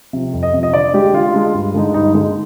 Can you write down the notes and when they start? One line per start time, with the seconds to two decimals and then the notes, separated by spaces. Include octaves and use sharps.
0.13 C3 F3
0.33 F2
0.43 D#5
0.53 C3 F3
0.63 D#5
0.73 D3 D5
0.93 G#3 D4 G4
1.13 D3 F4
1.34 G#3 D4
1.54 G2
1.74 D3 G#3 D#4
1.94 G2 D#4
2.14 D3 G#3 D#4